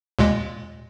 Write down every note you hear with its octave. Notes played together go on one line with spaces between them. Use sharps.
D#2 A#2 G#3